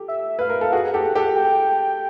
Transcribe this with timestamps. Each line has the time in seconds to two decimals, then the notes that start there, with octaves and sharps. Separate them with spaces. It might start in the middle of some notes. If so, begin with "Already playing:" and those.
Already playing: G4 A4
0.08 E5
0.39 B4 F5
0.49 A#4
0.61 A4
0.72 F#4 G#4 F#5
0.94 G4 A4
1.15 G4 A4
1.36 G5